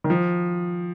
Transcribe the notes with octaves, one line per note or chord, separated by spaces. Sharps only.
D#3
F3